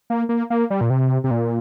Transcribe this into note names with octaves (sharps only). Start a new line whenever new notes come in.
A#3
A#3
A#3
G3
A#2
C3
C3
A#2